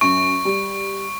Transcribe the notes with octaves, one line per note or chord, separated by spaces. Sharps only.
F#2 C#6
G3